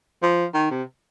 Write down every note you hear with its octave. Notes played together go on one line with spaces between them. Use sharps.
F3
D#3
C3